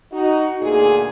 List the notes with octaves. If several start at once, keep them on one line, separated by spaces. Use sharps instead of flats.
D#4 F#4
D2 A#2 G#4